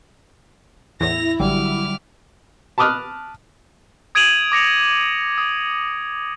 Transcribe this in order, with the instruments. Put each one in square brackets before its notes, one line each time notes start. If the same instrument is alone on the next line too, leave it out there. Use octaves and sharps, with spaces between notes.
[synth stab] E2 A2 [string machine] E4 [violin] A#6 F7
[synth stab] A1 [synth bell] D3 F#3 G3 [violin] D6 F6
[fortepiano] A5 B5 D6 D#6 F6 F#6
[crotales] D#6 G#6 D7 D#7 F7 F#7
D6 A#6 C#7 F7
D#6